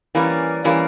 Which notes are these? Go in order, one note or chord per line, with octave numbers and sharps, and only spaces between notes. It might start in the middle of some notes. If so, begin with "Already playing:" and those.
E3 G3 A#3 C#4
E3 G3 A#3 C#4